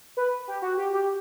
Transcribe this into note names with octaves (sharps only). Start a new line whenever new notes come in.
B4
G4
F#4
G4
G4